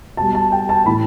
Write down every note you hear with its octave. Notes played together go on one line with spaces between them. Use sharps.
B2 G3 A5
A5
G5
A5
A2 E3 A3 B5